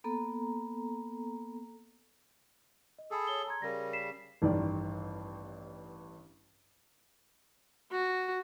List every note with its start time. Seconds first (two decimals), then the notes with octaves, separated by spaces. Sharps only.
0.04 A#3 B3 A4 A#5
2.99 D#5
3.11 G#4 A4 B5 D#6
3.27 C#5 G7
3.47 A#5 C6 G#6
3.62 C#3 G3 G#4 A#4 A#6
3.93 B6 C7 E7
4.42 A1 G2 D#3 D5
7.91 F#4